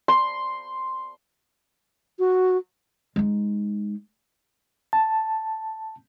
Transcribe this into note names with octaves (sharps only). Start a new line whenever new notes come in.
C6
F#4
G#3 D#4
A5